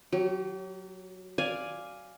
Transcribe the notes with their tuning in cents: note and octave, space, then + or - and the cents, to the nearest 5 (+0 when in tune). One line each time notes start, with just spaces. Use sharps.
F#3 +0 G4 -35
D5 +0 F5 +0 G#5 +0